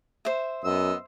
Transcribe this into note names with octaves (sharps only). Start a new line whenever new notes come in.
C5 E5
F#2 B3 D#5 E6